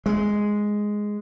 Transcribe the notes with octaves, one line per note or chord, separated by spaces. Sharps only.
G#3